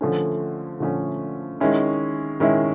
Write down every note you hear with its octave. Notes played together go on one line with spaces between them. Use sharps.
D3 F3 A3 C#4
D3 F3 A3 C#4
D#3 G#3 C#4 E4
D#3 G#3 C#4 E4